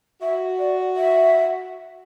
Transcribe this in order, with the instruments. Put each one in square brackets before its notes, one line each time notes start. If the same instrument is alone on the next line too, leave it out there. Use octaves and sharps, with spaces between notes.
[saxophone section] F#4 [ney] E5
[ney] D5
E5